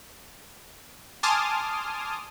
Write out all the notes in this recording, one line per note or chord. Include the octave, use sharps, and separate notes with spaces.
G#5 A5 C6 D6 D#6 F6